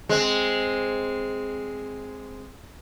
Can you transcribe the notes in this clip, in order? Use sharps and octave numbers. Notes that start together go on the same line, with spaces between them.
G#3 C4